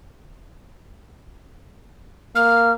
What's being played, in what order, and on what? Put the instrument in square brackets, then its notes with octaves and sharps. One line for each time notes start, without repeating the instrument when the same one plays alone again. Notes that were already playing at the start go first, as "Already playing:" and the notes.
[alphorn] A#3 [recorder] F6